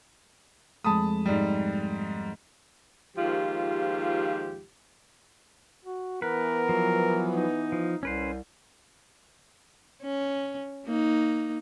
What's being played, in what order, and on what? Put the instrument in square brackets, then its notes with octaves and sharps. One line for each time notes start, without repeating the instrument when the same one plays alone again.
[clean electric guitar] F2 G#3 A3 [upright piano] A5 B5 D#6
[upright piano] G#2 G3
[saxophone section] D#2 G#2 F3 F4 G4
[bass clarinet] F#4
[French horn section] E3 B3 [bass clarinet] A#4 [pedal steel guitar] B4
[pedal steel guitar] F3 F#3
[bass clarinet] D#4
[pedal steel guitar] F3
[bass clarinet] C2 [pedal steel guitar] C#4 B4 C5
[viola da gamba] C#4
A#3 D#4